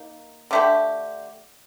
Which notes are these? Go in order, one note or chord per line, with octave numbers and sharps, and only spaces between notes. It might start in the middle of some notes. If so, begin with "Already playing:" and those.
Already playing: A#3 D#4
D3 A3 D4 G4